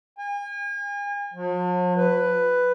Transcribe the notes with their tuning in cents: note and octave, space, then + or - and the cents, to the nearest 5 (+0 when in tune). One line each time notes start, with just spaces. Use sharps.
G#5 -40
F3 +45
B4 +5